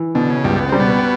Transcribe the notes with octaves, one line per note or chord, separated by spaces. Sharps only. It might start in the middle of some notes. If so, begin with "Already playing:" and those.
Already playing: E3
B2 D3
C#3
C#2 G2 G3
B3
G3 C4
B2 B3